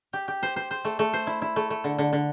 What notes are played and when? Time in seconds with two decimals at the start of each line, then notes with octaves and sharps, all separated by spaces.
0.13 G4
0.28 G4
0.43 C5
0.56 C5
0.71 C5
0.85 A3
0.99 A3
1.13 C5
1.27 E4
1.42 E4
1.56 A3
1.70 A3
1.84 D3
1.98 D3
2.13 D3